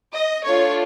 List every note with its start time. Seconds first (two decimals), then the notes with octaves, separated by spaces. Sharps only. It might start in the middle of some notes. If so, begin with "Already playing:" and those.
0.15 D#5
0.45 A3 D4 F4 C#5